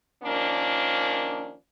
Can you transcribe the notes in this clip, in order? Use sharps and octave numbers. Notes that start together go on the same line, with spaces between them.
D#3 F3 A#3 C#4 D4